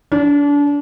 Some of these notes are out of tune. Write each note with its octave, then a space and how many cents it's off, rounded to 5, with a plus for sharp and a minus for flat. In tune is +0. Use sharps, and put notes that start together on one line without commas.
D4 -30